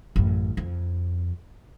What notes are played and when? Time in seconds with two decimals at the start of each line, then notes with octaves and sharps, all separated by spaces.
0.16 A1 F#2
0.57 F2